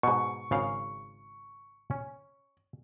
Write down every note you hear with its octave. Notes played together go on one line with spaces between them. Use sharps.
G#2 B2 C#6
G#1 C#3 F5
C#4